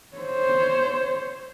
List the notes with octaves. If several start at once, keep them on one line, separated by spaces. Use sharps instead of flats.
C5 C#5